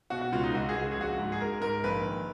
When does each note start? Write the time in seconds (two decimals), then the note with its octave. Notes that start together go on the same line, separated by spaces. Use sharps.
0.10 B2 F#4
0.21 F#4
0.32 C#2 F4
0.43 D#4
0.53 C#2 F#4
0.69 G#4
0.75 C#2
0.82 F#4
0.92 G#4
0.97 A#1 F#4
1.18 G#2
1.32 G#4
1.40 G#2 A#4
1.62 G#2 A#4
1.84 A#1 B4
2.05 D#3